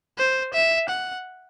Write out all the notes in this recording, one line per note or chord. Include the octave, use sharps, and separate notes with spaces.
C5
E5
F#5